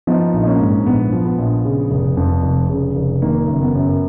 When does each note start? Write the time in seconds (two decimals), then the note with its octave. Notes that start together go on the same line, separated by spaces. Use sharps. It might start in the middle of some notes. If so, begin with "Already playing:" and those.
0.07 F3 B3 D#4
0.33 A#1 D#4
0.47 A#3 C#4
0.60 G#2
0.86 A#1 B3
1.12 F3
1.25 B3
1.38 A#1
1.65 C#3
1.91 F1
2.17 F2
2.43 F1
2.69 C#3
2.96 F1
3.22 D#3 A#3
3.48 F#1
3.61 B3
3.75 F#2